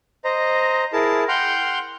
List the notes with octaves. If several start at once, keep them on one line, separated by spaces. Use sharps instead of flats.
C5 D#5 A#5
E4 G#4 A#4 A5
F#5 G5 C6 F6 G6